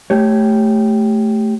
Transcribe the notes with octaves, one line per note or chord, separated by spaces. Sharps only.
A3 G4 C#5